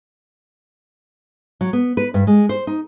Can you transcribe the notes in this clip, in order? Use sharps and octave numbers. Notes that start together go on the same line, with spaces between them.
F#3
B3
B4
G2
G#3
C5
D#4